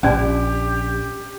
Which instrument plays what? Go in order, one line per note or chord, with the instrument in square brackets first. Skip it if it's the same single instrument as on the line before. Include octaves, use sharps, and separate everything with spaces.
[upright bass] A#1 [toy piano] C#4 D5 G#5 [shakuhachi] G4